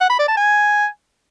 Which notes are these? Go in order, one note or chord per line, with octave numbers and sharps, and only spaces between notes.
F#5
B5
D5
A5
G#5